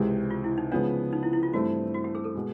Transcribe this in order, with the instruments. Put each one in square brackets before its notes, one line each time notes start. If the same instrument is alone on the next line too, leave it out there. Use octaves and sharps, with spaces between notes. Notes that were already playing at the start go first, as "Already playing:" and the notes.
Already playing: [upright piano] C#2 C3 E3 G#3 C4
[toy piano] F4
E4
D#4
[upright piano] C#3 F3 G#3 B3 [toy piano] D4
[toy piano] D#4
E4
E4
F4
[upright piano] G2 E3 A3 C4 E4 [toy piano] F#4
[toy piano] F#4
G4
G#4
A4
[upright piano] B2 G#3